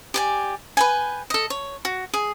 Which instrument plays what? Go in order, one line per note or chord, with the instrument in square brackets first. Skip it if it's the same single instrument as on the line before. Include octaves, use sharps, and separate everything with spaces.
[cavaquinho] G4 D5 G#5
B4 G5 G#5
A4 D#5
C#5
F#4
G#4